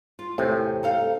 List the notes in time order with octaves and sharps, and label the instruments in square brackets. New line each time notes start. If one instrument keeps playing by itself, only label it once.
[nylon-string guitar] F4
[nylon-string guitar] E2 C5 G#5 [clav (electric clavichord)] A2 C3
[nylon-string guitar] D#4 A4 F5